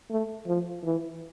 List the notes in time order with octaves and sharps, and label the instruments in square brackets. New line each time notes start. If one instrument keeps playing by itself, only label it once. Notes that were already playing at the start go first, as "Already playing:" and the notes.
[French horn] A3
F3
E3